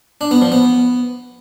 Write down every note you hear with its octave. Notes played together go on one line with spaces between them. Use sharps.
D4
B3
F3
B3